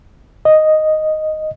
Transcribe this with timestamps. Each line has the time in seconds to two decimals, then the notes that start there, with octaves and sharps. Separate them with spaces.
0.45 D#5